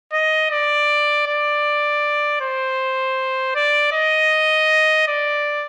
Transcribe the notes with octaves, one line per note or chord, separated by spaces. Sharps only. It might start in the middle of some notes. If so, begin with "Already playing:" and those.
D#5
D5
D5
C5
D5
D#5
D5